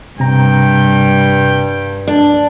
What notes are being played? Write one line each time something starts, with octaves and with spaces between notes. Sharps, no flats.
G2 C3 G5 A#5
D4